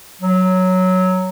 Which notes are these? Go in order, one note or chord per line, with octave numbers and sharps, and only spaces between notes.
F#3